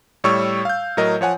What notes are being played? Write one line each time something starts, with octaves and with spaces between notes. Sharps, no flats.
A2 G3 C#5 C#6 E6
F5 G6
A2 F#3 A#4 D#5
F3 C#5 F#5 G#5